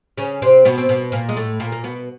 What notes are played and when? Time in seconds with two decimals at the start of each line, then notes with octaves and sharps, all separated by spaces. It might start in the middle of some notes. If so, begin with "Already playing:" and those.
0.18 C#3 C#4
0.42 C3 C4
0.65 B2 B3
0.78 C4
0.89 B2 B3
1.12 A#2 A#3
1.29 G#3
1.36 A2 A3
1.60 A#2 A#3
1.72 A#3
1.84 B2 B3